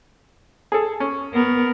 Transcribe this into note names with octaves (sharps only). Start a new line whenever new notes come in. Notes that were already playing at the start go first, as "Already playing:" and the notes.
G#4 A4
C#4
B3 A#4